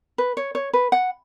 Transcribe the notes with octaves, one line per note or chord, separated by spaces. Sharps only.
B4
C#5
C#5
B4
F#5